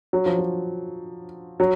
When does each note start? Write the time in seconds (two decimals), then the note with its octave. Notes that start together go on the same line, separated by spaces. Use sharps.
0.13 F#3
0.26 F3
0.39 F#3
1.60 F#3